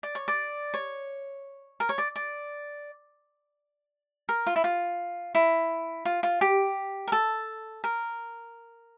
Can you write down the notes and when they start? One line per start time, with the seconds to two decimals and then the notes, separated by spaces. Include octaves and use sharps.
0.03 D5
0.15 C#5
0.28 D5
0.74 C#5
1.80 A#4
1.89 C#5
1.98 D5
2.16 D5
4.29 A#4
4.47 F4
4.56 E4
4.64 F4
5.35 E4
6.05 F4
6.23 F4
6.41 G4
7.08 A#4
7.12 A4
7.84 A#4